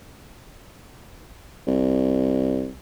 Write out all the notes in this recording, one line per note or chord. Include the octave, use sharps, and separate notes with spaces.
C2